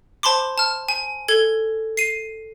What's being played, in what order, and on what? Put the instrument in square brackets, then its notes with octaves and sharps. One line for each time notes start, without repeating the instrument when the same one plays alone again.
[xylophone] C5 A5 B5 C6 D6
A5 F6
G#5
A4 G#6 G7
C7 D#7